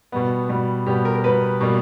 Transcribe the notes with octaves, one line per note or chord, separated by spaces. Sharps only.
B2 G3 B3
B2 G3 B3
B2 G3 B3 G4
A#4
A#4
B2 G3 B3 B4
B2 G3 A#3